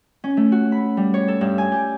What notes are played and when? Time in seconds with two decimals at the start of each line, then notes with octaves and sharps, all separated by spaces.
0.24 C#4
0.37 A3
0.52 F#4
0.72 B5
0.97 G3
1.14 C#5
1.28 A4
1.41 G2
1.58 G#5
1.72 G4